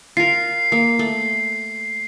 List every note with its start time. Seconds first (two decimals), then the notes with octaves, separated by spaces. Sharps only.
0.17 F4 A#4 C7
0.72 A#3
0.99 A3